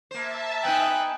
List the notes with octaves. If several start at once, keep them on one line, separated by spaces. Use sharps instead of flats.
A#3 C5 E5 A5
B3 D#4 G5 G#5 F#6